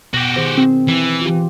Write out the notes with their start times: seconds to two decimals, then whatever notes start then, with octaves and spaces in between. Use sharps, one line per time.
0.14 B2 F#4 G4
0.36 D#3 G#4 C5
0.58 C4
0.88 E3
1.22 F4 G4